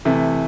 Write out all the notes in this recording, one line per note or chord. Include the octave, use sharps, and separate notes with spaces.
C3 E3 A3